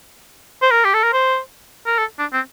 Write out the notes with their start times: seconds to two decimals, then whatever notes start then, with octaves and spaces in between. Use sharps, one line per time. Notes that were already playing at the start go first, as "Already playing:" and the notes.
0.62 C5
0.71 A#4
0.85 G4
0.94 A4
1.03 A#4
1.13 C5
1.86 A#4
1.98 A4
2.19 D4
2.33 C4